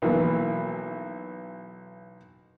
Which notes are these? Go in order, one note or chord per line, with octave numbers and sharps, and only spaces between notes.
B1 E3 A#3